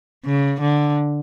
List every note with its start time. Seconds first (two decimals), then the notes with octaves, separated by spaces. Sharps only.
0.25 C#3
0.60 D3